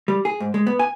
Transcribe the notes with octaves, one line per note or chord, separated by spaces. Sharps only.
G3
G#4
G#2
G#3
B3
G#5